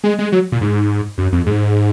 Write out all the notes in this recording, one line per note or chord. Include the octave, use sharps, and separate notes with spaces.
G#3
G#3
F#3
A#2
G#2
F#2
F2
G#2